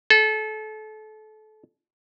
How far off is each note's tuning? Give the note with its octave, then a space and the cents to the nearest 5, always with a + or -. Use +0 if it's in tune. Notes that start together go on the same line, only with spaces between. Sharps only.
A4 -30